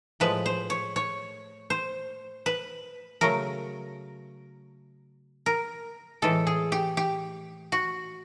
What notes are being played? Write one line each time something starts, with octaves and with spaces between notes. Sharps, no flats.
A2 F3 G#3 B4
C5
C#5
C#5
C5
B4
C#3 F#3 A3 A#4
A#4
A2 E3 G#3 A4
G#4
G4
G4
F#4